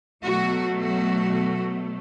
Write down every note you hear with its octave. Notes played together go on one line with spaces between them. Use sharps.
B2 F#3 A3 F#4
F#4